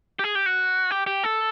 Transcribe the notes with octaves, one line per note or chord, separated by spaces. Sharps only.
G4
G#4
G4
F#4
G4
G4
A4